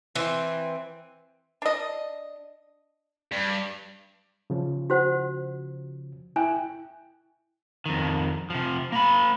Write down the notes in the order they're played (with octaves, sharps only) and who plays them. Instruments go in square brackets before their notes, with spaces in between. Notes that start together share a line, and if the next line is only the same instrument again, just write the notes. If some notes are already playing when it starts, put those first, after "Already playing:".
[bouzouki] E3 C4
[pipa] D4 D#5
[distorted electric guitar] G2
[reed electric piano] C#3 F3
[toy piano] F#4 C5 F#5
[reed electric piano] E4 G5 F#6 [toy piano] G#5
[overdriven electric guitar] F2 D#3
C3 F3
A#3 B5